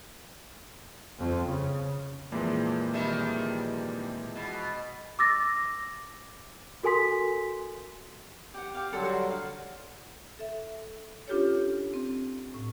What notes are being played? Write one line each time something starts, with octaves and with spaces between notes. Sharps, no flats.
F2
C#3
F2 A#2 E3 G#3
D#3 G3 E5
B2
D6 E6 A6 A#6
F#4 A4 A#4 G#5 C6 B6
G4 F#5
G4 F5
D3 F#3 G3 A4 F#5 C6
F#4 F#5 C6
F5
A4 E5
C#4 D4 F4 G4 A4 C#5
C4
A2